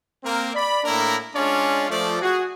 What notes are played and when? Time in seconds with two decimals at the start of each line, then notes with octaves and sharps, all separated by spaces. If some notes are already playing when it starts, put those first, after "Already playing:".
0.24 A#3 C4 A#4
0.54 D5 B5
0.84 A2 A#3 D4 E4 A#4 A#5
1.35 G#3 C#4 D4 F4 C#5 D5
1.90 F3 A3 D5
2.22 F#4 G#4